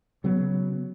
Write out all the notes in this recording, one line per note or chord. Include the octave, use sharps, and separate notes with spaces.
C#3 F#3 B3